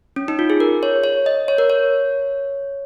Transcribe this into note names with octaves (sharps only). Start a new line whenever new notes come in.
C#4
D#4
F4
G#4
A#4
C#5
C#5
D#5
C#5
A#4
C#5